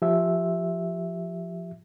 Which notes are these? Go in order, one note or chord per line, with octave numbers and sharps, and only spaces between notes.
F3 G4 E5